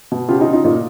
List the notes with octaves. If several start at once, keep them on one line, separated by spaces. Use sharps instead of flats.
B2
C#3 F4 G4
D#4 F4
C#3
D#4 F4
A#2 D#4 F4